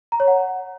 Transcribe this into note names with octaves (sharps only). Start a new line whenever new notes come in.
A#5
C#5
F#5